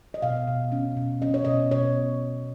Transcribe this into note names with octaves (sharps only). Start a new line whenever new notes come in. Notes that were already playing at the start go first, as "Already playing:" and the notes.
D#5
B2 F5
B2
C#4
B2
C#4 D#5
C#5
B2 D#5
B2 C#5